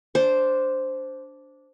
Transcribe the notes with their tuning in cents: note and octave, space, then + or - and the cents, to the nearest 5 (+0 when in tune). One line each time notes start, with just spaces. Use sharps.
D4 -10 C5 +0